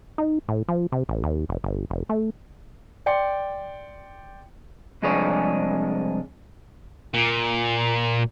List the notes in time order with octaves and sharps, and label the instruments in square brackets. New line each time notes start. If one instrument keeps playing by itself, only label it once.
[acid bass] D#4
A2
F3
C3
A1
D#2
F1
G1
F1
A3
[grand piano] D5 G5 C6 C#7
[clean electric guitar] C2 F2 G#3 D4 G#4 C#5
[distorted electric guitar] A#2